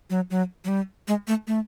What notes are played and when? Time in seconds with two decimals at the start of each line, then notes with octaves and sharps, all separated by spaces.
0.10 F#3
0.30 F#3
0.65 F#3
0.68 G3
1.08 G#3
1.28 A3
1.47 A3